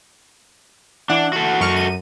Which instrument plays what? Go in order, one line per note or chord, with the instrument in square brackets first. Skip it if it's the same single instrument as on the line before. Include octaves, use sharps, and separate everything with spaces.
[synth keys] E3 F#5 [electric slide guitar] D4
[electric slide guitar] F#4 A4
[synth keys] F#2 C#6 F6
F#2 D#7